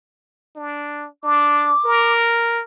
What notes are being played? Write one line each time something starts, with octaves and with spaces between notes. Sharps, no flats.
D4
D4 D6
A#4